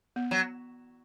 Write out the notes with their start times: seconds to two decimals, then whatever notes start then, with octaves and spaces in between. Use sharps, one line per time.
0.16 B3
0.31 F#3